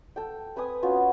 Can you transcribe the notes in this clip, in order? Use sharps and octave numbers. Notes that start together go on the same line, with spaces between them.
A4 G5
C4 B4 G#5 D#6
B3 C#4 F4 F#4